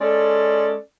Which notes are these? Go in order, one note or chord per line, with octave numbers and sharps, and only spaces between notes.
G#3 C#4 A4 D5